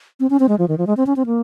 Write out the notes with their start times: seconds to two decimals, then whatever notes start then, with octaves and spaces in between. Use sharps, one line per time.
0.20 C4
0.30 C#4
0.40 C4
0.49 G#3
0.59 F3
0.68 D#3
0.78 F3
0.87 G#3
0.97 C4
1.07 C#4
1.16 C4
1.26 A#3